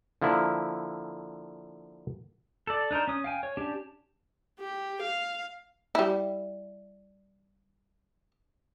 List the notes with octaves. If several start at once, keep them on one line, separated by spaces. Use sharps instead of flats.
D3 F3 A#3 E4
A4 D5
D4 D#4 A#4 C5
C#4 D#6
F5 G5 G#5
C#5
C#4 D4 G4
G4
F5
G3 E4